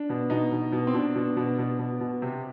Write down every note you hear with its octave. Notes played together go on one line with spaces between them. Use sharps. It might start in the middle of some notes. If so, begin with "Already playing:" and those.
Already playing: D4
B2
B2 D#4
B2
B2
C4
B2 D4
B2
B2
B2
B2
B2
C3